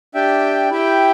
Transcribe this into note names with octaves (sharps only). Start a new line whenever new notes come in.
D4 G4 E5 G5
E4 G4 E5 G5